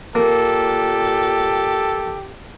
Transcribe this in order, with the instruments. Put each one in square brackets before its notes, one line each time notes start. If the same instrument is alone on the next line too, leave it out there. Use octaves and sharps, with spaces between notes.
[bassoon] A#2 [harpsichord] A#3 [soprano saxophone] G4 [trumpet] A4